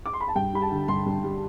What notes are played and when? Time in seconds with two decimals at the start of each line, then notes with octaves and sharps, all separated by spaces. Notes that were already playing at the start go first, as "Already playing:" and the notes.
0.06 D6
0.13 C6
0.21 B5
0.28 A5
0.36 G2 G5
0.53 G3 B5
0.62 A5
0.71 D3
0.88 G2 C6
1.06 G2
1.24 G3